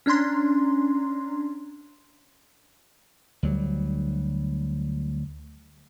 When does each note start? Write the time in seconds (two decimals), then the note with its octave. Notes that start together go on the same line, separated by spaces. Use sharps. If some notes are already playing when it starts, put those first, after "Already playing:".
0.06 C#4 D4 A#5 C6
3.43 D2 F#3 G3